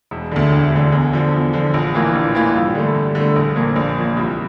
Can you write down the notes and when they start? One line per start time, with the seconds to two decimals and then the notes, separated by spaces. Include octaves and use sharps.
0.11 E1
0.31 D2 D3
0.52 E1
0.72 D2 D3
0.92 E2
1.13 D3 F3
1.33 E2
1.53 D3 F3
1.74 A#1
1.94 A2 E3 A#3 F4
2.15 A#1
2.34 A2 E3 A#3 F4
2.55 G2
2.75 D3 A3
2.95 G2
3.15 D3
3.20 A3
3.36 A#1
3.56 A#2 F3 A#3
3.76 A#1
3.97 A#2 F3 A#3
4.16 C2